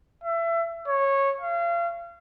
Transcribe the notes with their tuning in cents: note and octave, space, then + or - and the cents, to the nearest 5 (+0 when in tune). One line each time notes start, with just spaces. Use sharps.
E5 +25
C#5 -15
F5 -35